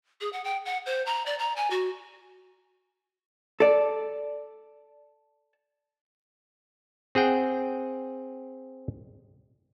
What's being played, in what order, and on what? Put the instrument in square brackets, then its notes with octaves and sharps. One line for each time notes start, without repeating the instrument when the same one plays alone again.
[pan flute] G#4
F#5
G5
F#5
C5
A#5
D5
A#5
G#5
F#4
[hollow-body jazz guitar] A4 D5
[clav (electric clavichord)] C4 G#4 F#5 G5